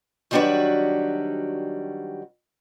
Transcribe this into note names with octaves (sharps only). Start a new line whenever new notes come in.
D#3 F#3 G3 D4 F#4 B4